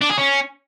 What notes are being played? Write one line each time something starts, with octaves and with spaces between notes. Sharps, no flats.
D4
G#4
C#4